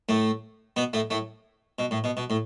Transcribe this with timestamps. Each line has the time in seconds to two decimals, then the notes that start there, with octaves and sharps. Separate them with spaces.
0.09 A2 A3
0.76 B2 B3
0.93 A2 A3
1.10 A2 A3
1.79 B2
1.91 A2
2.04 B2
2.17 B2
2.30 A2